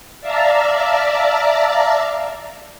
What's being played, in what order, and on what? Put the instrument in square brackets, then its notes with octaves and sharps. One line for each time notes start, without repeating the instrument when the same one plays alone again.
[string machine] D5 E5 F5 A5 A#5